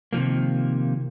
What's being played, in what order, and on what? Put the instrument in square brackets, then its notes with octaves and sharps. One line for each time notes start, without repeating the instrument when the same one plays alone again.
[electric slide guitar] C3 D#3 F3 A#3